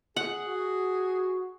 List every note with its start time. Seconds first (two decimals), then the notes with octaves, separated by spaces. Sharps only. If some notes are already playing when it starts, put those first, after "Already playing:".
0.16 G#4 F#5
0.47 F#4